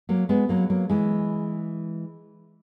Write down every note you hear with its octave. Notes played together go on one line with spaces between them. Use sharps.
F#3 A#3
G#3 B3
F#3 A#3
F#3 A#3
E3 G#3